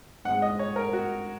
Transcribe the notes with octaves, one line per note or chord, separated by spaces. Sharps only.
G#2 G#3 F#5
D#5
C#5
A#4
F#4